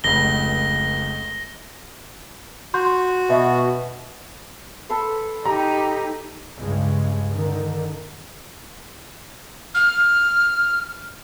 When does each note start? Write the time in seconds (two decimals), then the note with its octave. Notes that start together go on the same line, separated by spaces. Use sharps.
0.04 F1 C#2 A#6 G7
2.74 F#4 C6 G6
3.30 B2 E5
4.89 A4 B4 C6
5.45 D#4 G4 A#5
6.57 C#2 G2 C#3 G#3
7.34 D3 D#3
9.75 F6